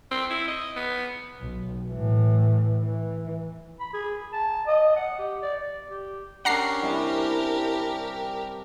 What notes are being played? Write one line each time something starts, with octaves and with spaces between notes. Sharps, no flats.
C4
E4
D#5
B3
B1
A2 E3
E3
B5
G#4
A5
D#5
F#5
G4
D5
D5
G4
C#4 D4 G4 A#4 F#5 A#5 C7
C3 G3 E4